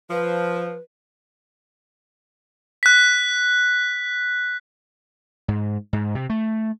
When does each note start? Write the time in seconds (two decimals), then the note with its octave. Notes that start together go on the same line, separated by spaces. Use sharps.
0.11 F3 B4
2.83 F#6 B6
5.48 G#2
5.93 G#2
6.15 C3
6.30 A3